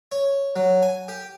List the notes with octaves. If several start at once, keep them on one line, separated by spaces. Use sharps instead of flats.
C#5
F#3
G#5
G4